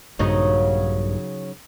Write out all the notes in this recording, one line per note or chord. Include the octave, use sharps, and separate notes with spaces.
A#1 G2 A#2 C#3 F#3 D#4